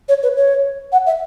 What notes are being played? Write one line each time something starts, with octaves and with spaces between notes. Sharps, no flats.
C#5
B4
C#5
F#5
E5